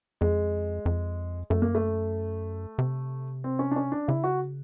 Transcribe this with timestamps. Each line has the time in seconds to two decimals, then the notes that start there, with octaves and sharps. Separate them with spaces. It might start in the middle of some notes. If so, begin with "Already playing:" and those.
0.21 F2 G#3
0.86 F2
1.50 F#2 A3
1.62 A#3
1.75 A3
2.79 C3
3.44 C4
3.59 C#4
3.71 D4
3.76 C#4
3.92 D4
4.08 C#3 E4
4.24 F#4